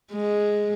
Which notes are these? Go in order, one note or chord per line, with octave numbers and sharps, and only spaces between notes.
G#3